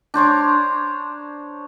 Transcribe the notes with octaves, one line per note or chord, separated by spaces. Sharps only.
D4 C5 C#5 A#5